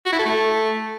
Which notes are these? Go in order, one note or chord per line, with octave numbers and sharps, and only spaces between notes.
F#4
E4
A4
A3